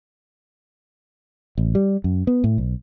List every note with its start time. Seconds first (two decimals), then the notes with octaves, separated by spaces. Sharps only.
1.58 A1
1.75 G3
2.04 F#2
2.27 B3
2.44 A2
2.58 B1